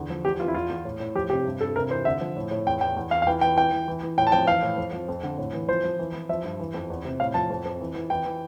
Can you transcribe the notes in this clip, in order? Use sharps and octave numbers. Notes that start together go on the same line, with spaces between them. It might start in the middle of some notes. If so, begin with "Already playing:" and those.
Already playing: E2 D3
F3
E2 G4
E3 F4
E4
E2 F4
E2
A2
A2
F3 G4
C3 G4
G2
G2 A4
C3 A#4
E3 C5
D3 E5
F3
A2
A2
E2 G5
E2 G5
E2
E2 F5
F5
E3 G5
E3 G5
E3 G5
E3
E3
E3
A2 G5
A5
F3 G5
E3 F5
A2
F2
F3
F2
D3
A2
E3
F3 C5
F3
E3
E3
F3 E5
G2
E3
F2
E2
C3
A2 F5
F3 A5
F2
F2
E3
E3
E3 G5
E3